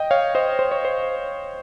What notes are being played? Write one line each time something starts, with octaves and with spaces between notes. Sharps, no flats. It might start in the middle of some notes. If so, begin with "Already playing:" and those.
Already playing: D#5 G5
C#5 F5
C5 D#5
C5
C#5
C5